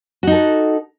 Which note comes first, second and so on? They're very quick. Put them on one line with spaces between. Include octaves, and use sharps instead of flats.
F#4 D#4 A4